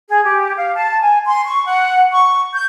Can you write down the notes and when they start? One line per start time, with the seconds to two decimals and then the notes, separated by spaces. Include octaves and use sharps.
0.08 G#4
0.24 G4
0.56 F5
0.75 A5
1.01 G#5
1.25 C6
1.46 C#6
1.65 F#5
2.12 C#6
2.54 G6